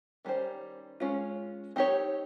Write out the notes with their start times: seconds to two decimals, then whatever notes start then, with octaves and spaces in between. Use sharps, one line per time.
0.25 D#3 G3 C#4 G4 C5
1.00 G#3 C#4 F4
1.76 C4 D#4 G4 C#5